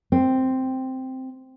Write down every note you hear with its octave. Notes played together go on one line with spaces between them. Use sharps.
C4